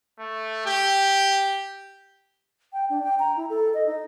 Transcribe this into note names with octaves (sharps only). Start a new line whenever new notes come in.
A3
G4
G5
D4
G5
A#5
E4
A4
D#5
D#4